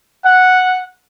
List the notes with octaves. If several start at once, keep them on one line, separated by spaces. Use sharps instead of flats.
F#5